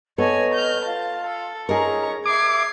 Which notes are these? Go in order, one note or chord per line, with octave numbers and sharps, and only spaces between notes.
B3 A4 C#5 D#5 G#5 C#6
F6 G6
F4 A5
A4
C#4 D#4 F4 G#4 A#4 A#5 C#6
E5 D6 D#6 G#6 C7